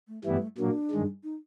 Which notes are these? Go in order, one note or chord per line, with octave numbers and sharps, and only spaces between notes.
A3
G2 E3 G3 A3 B3 E4
A#2 F#3 A#3 D4
G2 D#3 G#3
D#4